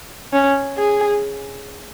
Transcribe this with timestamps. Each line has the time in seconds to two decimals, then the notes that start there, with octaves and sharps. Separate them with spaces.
0.33 C#4
0.78 G#4